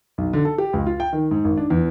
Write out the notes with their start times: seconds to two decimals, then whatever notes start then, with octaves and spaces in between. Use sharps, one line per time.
0.18 B1
0.33 D3
0.45 A4
0.58 G4
0.73 C#2
0.86 F4
1.00 G5
1.13 D#3
1.31 G#2
1.44 G#1
1.57 D4
1.70 E2